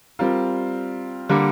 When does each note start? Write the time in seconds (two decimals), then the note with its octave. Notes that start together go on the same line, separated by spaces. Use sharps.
0.19 G3 C4 F4 A#4
1.29 D3 G3 A#3